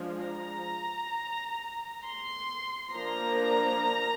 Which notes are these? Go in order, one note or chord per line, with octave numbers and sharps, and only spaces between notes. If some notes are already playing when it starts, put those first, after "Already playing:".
Already playing: F3 G#3 D4
A#5
C6
F3 A#3 D4 A#5